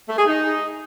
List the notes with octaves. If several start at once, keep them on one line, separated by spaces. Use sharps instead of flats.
A3
G#4
D#4